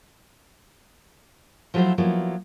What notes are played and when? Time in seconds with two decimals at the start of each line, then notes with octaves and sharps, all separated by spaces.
1.74 F3 F#3 A3 E4 F#4 C5
1.98 F3 F#3 A#3 B3 E4